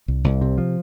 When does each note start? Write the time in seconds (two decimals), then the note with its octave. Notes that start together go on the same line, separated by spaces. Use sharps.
0.08 C2
0.24 C2
0.41 C3
0.58 F3